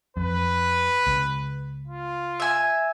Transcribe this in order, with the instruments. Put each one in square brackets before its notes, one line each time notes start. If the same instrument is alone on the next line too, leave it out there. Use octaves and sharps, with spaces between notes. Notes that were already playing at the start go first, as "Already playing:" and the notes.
[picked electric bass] F2 [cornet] B4
[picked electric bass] C#2
[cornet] F4
[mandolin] E5 G#5